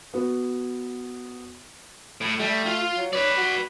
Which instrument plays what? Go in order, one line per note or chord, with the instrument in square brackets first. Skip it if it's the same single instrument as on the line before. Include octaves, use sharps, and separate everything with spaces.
[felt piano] B3 F#4 B4
[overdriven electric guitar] A2
[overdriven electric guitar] G3 [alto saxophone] A3
[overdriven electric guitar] F4 F5
[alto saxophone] F#3
[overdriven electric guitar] B4 D5 [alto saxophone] C#5
[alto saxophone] F#4